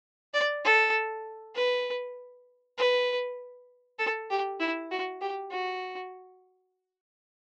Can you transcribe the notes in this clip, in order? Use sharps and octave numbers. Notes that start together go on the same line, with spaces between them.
D5
A4
B4
B4
A4
G4
E4
F#4
G4
F#4